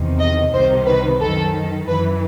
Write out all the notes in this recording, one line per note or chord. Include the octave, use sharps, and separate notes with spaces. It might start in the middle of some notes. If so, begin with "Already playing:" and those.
Already playing: E2 C3 D#3
D#5
C2 C3 D#3 C5
B4
F#2 D#3 A4
F#2 E3 B4